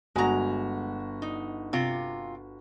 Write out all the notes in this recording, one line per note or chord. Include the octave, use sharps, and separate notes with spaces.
G1 G#3 F#4 A#5
D#4
C3 F4